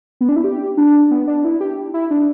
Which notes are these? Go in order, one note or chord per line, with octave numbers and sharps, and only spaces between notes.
B3
D4
E4
G4
D4
B3
D4
E4
G4
E4
D4